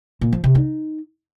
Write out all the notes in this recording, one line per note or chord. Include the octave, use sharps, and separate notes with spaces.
A#2
F3
C3
D#4